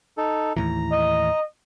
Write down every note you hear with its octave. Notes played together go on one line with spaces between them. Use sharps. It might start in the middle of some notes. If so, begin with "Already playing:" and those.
D#4 A4
D#2 A2 E3 A#5
D#5